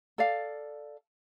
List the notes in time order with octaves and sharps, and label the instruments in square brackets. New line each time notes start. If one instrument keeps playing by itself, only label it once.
[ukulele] A4 D5 F5